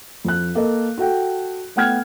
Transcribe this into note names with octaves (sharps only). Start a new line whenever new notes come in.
F2 F#6
A#3 A4 A#4 D#5
F#4 A4 F#5 G5
A3 B3 F#5 G5 F6 G#6